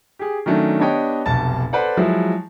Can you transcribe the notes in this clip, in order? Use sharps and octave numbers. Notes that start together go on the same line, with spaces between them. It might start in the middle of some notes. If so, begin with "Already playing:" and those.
G4 G#4
D#3 F#3 A3 C#4 D4
B3 D4 G4 C#5 D#5 G5
F1 B1 A5 A6
A4 B4 C5 D5 F#5
F3 F#3 G#3 E4